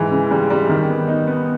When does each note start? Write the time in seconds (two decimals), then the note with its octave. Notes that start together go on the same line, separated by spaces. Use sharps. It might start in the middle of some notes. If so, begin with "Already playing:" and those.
Already playing: G#2 E3
0.11 C#3
0.31 G3
0.50 G3
0.69 D#3
0.89 B3
1.08 D#4
1.28 B3